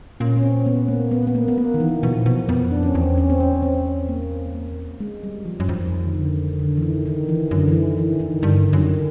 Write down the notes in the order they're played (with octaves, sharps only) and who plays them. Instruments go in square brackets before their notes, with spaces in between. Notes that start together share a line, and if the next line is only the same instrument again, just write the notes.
[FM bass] A#2 [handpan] C#4
[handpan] C#4
C4
B3
A#3
B3
B3
A#3
B3
A#3
D#3
E3
[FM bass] B2 [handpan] F3
[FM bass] A#2
B2
[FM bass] F2 [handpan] B3
[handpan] D4
C#4
[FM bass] E2 [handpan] C4
[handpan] C#4
C4
C#4
C4
C4
A#3
A#3
G#3
G3
F3
[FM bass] F#2
[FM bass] F2 [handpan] D#3
[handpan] D#3
D3
D3
E3
D#3
D#3
E3
[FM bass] F#2 [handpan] D3
[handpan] E3
D#3
E3
D#3
[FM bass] G2 [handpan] D3
[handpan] D3
[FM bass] F#2 [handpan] D#3